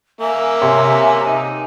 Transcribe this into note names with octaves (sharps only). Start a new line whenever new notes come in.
A#3 E5 G#5
C3 C#5 C6
D#4